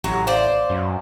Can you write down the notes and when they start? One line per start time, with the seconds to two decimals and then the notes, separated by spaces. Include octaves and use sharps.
0.04 A1 F#3 G4
0.27 C5 D5 F5 G6
0.69 F#2